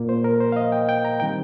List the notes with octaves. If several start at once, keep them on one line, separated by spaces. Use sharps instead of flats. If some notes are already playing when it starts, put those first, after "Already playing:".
Already playing: A#2 A#3
C5
A#4
C5
F5
D#5
G5
G5
A#5
D#3 G3 C4 G5